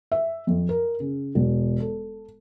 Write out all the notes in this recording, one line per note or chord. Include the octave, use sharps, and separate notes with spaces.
E5
F2
A#4
C#3
E1
A4